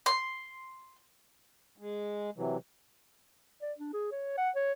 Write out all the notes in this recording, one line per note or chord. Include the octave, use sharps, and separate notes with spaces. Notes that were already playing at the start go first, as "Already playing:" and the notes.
C6
G#3
C3 E3 F#3
D5
D4
G#4
C#5
F#5
C#5